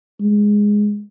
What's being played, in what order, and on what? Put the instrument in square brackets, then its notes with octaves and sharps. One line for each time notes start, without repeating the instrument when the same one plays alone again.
[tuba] G#3